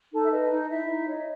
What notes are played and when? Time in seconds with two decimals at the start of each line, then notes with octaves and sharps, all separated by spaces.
0.13 D#4 A4 A5
0.24 E5
0.32 B4 D#5
0.51 D#4
0.70 D#4 E4 E5
0.90 D#4
1.09 C#5 D#5